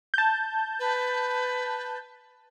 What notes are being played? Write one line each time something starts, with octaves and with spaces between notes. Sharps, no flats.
A5 G6
B4